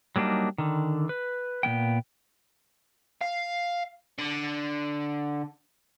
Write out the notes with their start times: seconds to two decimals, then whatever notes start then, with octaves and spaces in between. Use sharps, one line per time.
0.16 F#3 G3 A#3 D4 D#4
0.58 D3 D#3
1.09 B4
1.63 A#2 A#3 B3 G5
3.21 F5
4.18 D3